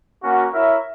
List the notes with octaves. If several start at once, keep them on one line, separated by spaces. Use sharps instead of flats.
A#3 C#4 F#4
E4 A#4 C#5 E5